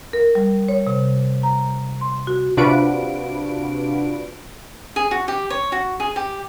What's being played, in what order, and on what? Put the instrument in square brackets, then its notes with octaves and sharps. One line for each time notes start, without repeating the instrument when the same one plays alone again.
[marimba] A#4
G3
C#5
C3
A#5
C6
F#4
[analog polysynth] C3 D4 F4 F#4 B4 D7
[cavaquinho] G#4
F#4
G4
C#5
F#4
G#4
G4